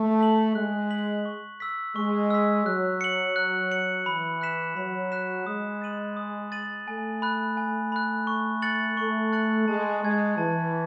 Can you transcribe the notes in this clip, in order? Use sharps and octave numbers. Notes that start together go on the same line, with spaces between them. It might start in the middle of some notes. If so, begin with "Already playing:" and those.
Already playing: A3
B6 F#7
G#3 F#6
B6 F#7
C#6
E6 B6
G#3 C#6
E6 B6
F#3 F#6
C#7 F#7
F#6
C#7 F#7
E3 B5
F#6 B6 E7
F#3 B5
F#6 B6 E7
G#3 D#6
A6 D#7 F#7
D#6
A6 D#7 F#7
A3 G#5
B5 F#6
G#5
B5 F#6
C#6
F#6 A6 C#7 F#7
A3 C#6
F#6 A6 C#7 F#7
G#3 A5
G#3 C#6 G#6 D#7
E3 A5